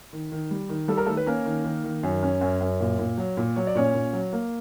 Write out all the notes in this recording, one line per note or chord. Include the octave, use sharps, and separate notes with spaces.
D#3
D#3
G3
D#3
G3 A4
A#4
D#3 A3 A4
B4
A#3 C#4 A#4
D#3
D#3
D#3
F#2
C#4
F#2
F#2
A#2
A#2
F#3
A#2
F#3 C#5
D5
A#2 C#4 C#5
A#2
F#3
A#3